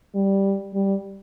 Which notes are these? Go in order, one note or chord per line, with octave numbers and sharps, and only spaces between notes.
G3
G3